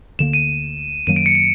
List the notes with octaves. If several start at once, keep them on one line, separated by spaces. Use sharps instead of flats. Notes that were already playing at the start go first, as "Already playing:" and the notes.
D2 D3 G3 A#3 E7
D#7
F#2 D#3 F#3 A#3 D#7
D7
C#7
D7